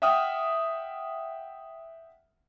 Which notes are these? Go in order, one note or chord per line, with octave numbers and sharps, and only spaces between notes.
E5 F#5 G5 D#6 F6